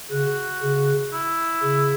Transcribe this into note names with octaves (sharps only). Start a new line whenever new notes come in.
C#3 F#4
C#3
E4
C#3